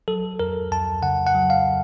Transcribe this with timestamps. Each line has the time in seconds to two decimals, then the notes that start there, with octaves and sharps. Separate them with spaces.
0.08 F#3 A4
0.40 F2 A#4
0.72 F2 A5
1.02 C#3 F#5
1.26 F#5
1.35 F#3
1.50 F5